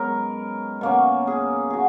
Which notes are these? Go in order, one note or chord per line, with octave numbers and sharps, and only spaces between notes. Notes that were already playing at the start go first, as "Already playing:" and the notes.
Already playing: F#2 G#3 B3 A#4 C#5 D#5
B2 A#3 C#4
G#4
F#4 G#4